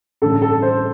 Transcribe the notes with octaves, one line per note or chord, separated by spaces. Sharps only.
A1 G2 D3 A4
A4
C5